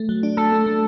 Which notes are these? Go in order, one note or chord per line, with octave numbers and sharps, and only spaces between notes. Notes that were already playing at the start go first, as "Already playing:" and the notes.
Already playing: A3
F#3
D4
A3 A4
A3
A3